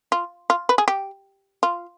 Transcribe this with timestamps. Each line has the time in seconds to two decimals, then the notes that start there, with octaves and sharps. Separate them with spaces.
0.12 F4
0.50 F4
0.69 B4
0.78 G#4
0.88 G4
1.63 F4